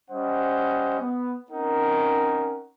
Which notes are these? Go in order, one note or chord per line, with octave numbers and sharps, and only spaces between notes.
G3 C#4 C5 D#5 F#5
B3
C4 C#4 D#4 A#4 F#5